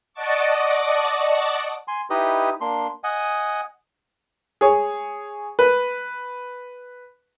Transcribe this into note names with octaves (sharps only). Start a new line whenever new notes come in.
D5 D#5 F#5 A5 C#6 D6
G#5 C6
D#4 E4 G4 B4 D#5
A#3 D4 C6
D#5 F#5 G#5
G#4 C#5
B4